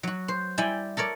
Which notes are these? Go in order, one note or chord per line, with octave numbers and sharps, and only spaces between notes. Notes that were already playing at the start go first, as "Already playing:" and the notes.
F#3 F#4
C5
G3 E4 D5 G5 G#5
A4 A#4 C#5 D5